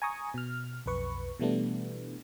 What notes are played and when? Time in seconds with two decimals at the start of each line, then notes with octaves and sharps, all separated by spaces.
0.02 G#5 A#5 C#6 D#6
0.34 B2 F6
0.86 B1 F2 B4 C#6
1.40 B2 E3 G3 A3 B3 D4